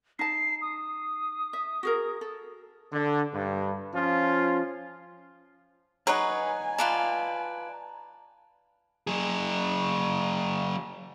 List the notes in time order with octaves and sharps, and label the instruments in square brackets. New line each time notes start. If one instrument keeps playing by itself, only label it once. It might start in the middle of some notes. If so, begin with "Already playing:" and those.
[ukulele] D#4 A5 [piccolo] C7
[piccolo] D#6
[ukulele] E5
F#4 G#4 A#4
A4
[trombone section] D3
G2
F3 C#4 F4
[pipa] F#3 D#4 [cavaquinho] G#4 B4 C#5 [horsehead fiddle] G#5
[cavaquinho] F4 B4 D5 [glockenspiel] A5 A#5 D7
[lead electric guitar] F#3 G#4